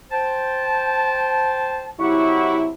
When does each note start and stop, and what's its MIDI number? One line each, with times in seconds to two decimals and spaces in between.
0.11 1.90 72
0.11 1.90 79
0.11 1.90 81
2.00 2.70 48
2.00 2.70 54
2.00 2.70 64
2.00 2.61 67
2.00 2.61 78
2.00 2.61 85